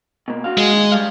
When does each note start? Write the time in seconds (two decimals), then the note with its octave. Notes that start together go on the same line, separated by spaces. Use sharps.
0.28 B2 A#3
0.44 D4 F#4 F5
0.58 G#3
0.72 D#2
0.92 G3 F5